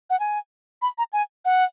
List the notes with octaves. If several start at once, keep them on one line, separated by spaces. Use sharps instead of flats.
F#5
G#5
B5
A#5
G#5
F#5